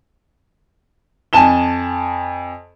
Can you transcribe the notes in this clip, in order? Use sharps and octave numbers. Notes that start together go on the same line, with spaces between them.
F2 G#5 A5 E7 G7